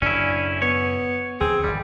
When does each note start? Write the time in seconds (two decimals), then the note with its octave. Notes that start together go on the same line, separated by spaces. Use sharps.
0.02 F#1 F#2 A2 C#4 D4 E4
0.62 B3 C#5
1.41 D2 F3 C4 G#4
1.64 G#1 F2 G3